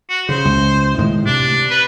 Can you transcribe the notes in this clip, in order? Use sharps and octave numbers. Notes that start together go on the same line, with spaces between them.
F#4
C#3 C5
C#2
A2 D#3 G#3
C3 D4
B4